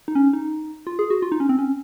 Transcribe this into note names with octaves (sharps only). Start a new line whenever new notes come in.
D#4
C#4
D#4
F4
G#4
F#4
F4
D#4
C#4
C4
C#4